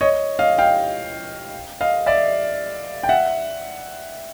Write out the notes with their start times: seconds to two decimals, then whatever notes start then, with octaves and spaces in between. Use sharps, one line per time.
0.01 C#5 D#5
0.39 D#5 F5
0.58 F5 G5
1.81 D#5 F5
2.06 D5 E5
3.03 G5
3.09 E5 F#5